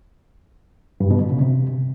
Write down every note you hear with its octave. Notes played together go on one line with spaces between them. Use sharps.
G2
B2
D3
C#3
C3